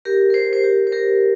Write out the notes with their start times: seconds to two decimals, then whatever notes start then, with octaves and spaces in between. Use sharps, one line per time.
0.05 G4 A#4
0.30 A#4
0.34 G#4 C5
0.53 C5
0.64 G4 A#4
0.87 C5
0.92 G4 A#4